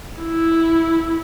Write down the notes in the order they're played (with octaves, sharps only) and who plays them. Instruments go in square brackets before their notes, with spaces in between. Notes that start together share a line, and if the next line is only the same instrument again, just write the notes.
[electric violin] E4